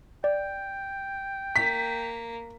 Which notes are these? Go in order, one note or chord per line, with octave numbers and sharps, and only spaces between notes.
D5 G5
A#3 B6